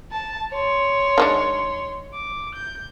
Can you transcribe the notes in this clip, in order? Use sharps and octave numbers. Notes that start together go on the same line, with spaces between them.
A5
C#5 C6
D#3 G#3 D4
D6
G6